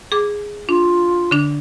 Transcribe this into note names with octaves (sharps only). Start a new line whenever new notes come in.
G#4 D6
D4 F4
D3 D4